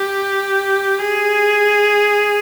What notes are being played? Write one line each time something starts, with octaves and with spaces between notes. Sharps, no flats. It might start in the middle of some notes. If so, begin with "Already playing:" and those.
Already playing: G4
G#4